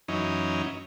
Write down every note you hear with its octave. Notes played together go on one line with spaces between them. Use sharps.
F#2 E3 C#4 D#4